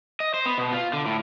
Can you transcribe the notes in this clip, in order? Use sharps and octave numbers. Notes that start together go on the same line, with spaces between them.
D#5
C5
B3
B2
F4
D3
A2